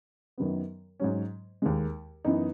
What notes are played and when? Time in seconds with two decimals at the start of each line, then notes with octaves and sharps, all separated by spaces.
0.38 F#2 D#3 F#3 B3
1.00 G#2 F#3 C#4
1.62 D#2 D#3 G#3
2.25 F#2 E3 B3 D#4